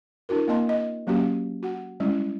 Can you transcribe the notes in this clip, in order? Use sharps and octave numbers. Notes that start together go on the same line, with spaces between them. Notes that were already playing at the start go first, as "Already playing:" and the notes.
D4 E4 F#4 A#4
A#3 C4 D#5 A5 C6
D#5
F#3 A#3 C#4 F#4 G4
F#4 F#5
G3 G#3 C#4 E4